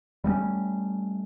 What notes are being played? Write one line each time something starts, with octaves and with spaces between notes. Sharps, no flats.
G3 A3 A#3 C#4